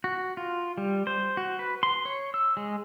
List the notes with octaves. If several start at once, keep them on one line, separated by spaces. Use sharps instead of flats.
F#4
F4
G3
C5
F#4
B4
C6
C#5
E6
G#3